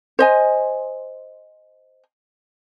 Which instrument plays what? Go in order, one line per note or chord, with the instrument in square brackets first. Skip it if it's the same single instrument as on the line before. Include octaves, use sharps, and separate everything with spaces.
[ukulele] C5 D#5 G#5